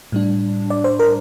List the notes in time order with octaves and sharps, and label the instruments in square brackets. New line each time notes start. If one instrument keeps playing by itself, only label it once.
[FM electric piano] A2 G3 D4
D5
C5
A#4